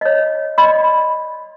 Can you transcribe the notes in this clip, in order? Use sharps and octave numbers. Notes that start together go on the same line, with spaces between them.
C#5 D#5
D5 D#5 B5 C6